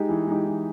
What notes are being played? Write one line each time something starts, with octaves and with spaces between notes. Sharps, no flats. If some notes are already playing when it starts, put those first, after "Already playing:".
Already playing: G#3 D#4 G4
E3
G#3 D#4 G4
E3